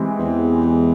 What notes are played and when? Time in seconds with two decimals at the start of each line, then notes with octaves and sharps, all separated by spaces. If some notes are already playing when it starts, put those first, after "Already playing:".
Already playing: E3 G#3 C4 G4
0.19 E2